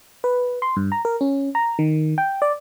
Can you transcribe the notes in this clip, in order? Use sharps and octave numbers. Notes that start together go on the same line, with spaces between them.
B4
C6
G2
A#5
A#4
C#4
A#5
D#3
G5
D5